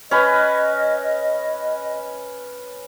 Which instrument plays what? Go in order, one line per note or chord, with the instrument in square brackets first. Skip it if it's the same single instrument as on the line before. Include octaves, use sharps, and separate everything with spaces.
[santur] C#4 B4 [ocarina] D#5